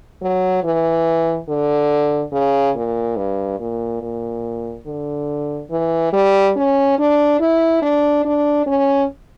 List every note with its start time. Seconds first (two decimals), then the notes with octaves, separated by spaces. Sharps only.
0.22 F#3
0.63 E3
1.48 D3
2.32 C#3
2.75 A#2
3.17 G2
3.60 A#2
4.02 A#2
4.86 D3
5.70 E3
6.13 G3
6.56 C#4
6.98 D4
7.40 E4
7.82 D4
8.25 D4
8.66 C#4